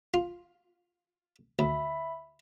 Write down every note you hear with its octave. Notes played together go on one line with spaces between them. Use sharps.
F4
D2 E5 B5